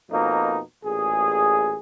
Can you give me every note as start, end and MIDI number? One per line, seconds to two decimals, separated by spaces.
0.10 0.59 41
0.10 0.59 47
0.10 0.59 58
0.10 0.59 63
0.85 1.78 33
0.85 1.78 46
0.85 1.78 68